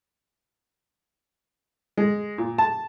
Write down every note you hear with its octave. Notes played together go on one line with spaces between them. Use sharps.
G#3
A#2
A5